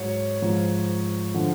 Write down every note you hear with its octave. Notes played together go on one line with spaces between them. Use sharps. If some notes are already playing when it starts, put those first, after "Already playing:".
Already playing: G#2 F#3 C#5
G#2 F3
D3 F3